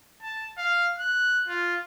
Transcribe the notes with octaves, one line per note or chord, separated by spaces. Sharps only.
A5
F5
F#6
F4